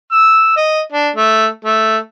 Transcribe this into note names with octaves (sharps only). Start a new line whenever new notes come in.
E6
D#5
D4
A3
A3